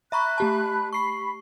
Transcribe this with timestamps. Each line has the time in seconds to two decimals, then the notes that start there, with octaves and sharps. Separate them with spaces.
0.12 E5 A#5 B5 C#6 F#6
0.38 A3 G4 A5
0.93 B5 C#6 C7